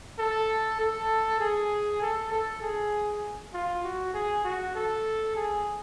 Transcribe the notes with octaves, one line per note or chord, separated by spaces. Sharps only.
A4
A4
G#4
A4
A4
G#4
F4
F#4
G#4
F#4
A4
G#4